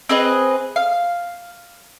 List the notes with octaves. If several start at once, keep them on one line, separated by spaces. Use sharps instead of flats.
C4 G#4 B4 D#5
F5